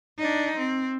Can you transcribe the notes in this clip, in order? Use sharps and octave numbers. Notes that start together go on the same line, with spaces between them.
D4 D#4
C4